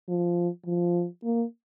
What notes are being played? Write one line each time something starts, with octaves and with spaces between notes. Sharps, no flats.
F3
F3
A#3